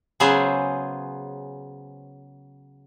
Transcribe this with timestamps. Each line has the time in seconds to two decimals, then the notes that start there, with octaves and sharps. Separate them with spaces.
0.20 C#3 F#3 B3 G#4 B4 C5